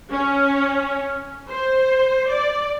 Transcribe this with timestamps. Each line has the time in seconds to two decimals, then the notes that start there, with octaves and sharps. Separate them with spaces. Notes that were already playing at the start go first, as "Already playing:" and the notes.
0.11 C#4
1.50 C5
2.31 D5